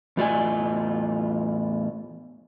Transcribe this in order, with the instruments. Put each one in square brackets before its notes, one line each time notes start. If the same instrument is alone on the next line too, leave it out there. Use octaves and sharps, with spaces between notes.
[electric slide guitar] E2 A2 F4 D5 D#5 G#5